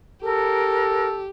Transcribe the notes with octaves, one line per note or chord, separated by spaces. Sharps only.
G4 A4 A#4